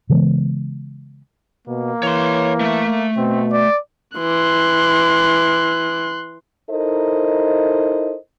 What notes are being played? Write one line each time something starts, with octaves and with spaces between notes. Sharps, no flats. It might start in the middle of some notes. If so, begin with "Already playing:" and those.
C#3 E3 G#3 B3
B2 A#3
E3 C#5 C6
A3 E5
B2 C4
D5
E3 C6 F#6
D#4 E4 A4 A#4 C5 D#5